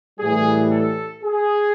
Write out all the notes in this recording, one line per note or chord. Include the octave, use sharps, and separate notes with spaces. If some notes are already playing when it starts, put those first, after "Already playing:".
A2 E3 G3 G#4
A4
G#4